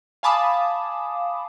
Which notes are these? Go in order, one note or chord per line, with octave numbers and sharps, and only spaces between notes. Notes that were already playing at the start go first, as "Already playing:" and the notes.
F5 G#5 A5 B5 D6 D#6